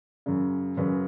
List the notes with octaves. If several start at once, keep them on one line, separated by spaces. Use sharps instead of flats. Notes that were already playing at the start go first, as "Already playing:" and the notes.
F#2 C#3
F#2 C#3 B4